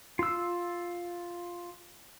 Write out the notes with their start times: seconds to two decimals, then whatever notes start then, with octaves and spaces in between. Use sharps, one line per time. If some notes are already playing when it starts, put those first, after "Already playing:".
0.19 F4 E6